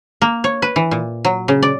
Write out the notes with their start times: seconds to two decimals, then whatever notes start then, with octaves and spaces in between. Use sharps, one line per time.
0.22 A#3
0.44 C#5
0.62 B4
0.76 E3
0.91 A#2
1.25 F#3
1.48 C#3
1.63 D5